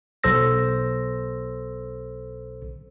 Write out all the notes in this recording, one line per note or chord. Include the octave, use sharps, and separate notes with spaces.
B1 A4 C5 E6 A#6